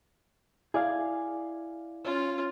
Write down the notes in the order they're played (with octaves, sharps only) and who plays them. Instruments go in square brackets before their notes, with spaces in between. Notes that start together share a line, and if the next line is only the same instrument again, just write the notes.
[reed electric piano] E4 D5 F5 [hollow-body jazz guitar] G#4
[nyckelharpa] C#4 F4